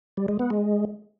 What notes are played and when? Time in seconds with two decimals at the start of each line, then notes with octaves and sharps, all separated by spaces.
0.17 G3
0.28 G#3
0.39 B3
0.50 G#3